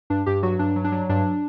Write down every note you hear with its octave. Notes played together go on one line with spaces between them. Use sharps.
G2 D4
G2 G4
F#3 F#4
G2 D4
F#3
D4
F#3
G2 D4